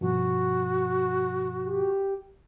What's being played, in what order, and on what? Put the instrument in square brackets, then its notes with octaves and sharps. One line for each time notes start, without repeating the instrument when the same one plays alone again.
[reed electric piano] G2 B2 F3 [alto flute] F#4
[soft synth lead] G4